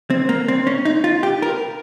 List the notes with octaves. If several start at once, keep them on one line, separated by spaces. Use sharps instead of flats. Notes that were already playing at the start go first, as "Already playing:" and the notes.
C4
A#3
C4
C#4
D#4
F4
G4
A#4